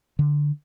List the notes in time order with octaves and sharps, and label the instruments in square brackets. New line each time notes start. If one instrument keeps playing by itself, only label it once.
[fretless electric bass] D3